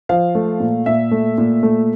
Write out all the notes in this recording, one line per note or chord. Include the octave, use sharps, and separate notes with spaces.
F3 F5
A3
A#2
A#2 E5
A3
A#2
A3